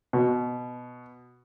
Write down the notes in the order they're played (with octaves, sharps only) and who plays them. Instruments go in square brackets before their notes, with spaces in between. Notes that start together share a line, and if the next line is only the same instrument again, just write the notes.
[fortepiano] B2